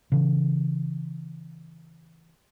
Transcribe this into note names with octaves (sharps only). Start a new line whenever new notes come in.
C#3 E3